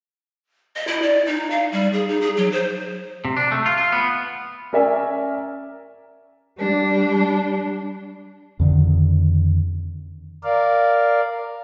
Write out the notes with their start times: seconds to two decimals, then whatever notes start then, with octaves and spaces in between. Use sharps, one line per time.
0.76 D#5
0.88 E4
1.02 D5
1.26 D#4
1.51 F5
1.72 G3
1.93 G#4
2.08 D#4
2.21 G#4
2.37 F#3
2.52 C5
3.25 C3
3.37 D4
3.52 A3
3.66 F4
3.78 F4
3.92 B3
4.73 C#4 A#4 D5 E5 G#5
6.58 G3 D4
8.59 F2 D3 D#3
10.44 A#4 D5 F5